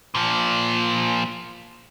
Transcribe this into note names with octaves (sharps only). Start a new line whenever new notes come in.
A#2 F3